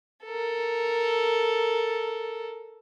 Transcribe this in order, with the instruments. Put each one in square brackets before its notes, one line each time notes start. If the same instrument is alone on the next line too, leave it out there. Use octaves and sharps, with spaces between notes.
[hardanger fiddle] A4 A#4